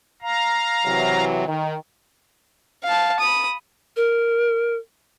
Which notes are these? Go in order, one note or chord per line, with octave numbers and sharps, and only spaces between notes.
F5 A#5
C3 E3 F#3
D#3
F5 A5
B5 D#6
A#4